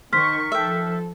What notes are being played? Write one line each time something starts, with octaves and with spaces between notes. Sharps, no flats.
D#3 C5 C#6 F6 B6
F3 A4 E5 G5